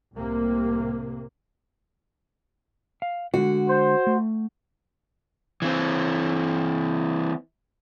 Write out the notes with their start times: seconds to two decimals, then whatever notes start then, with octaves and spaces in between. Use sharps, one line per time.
0.13 C2 A2 C3 A#3
3.02 F5
3.34 D3 G#3 F#4
3.69 C5
4.07 A3
5.62 E3 C4